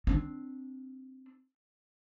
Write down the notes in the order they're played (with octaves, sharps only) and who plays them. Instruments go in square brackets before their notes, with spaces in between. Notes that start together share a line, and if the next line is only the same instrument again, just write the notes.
[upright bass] C4 D4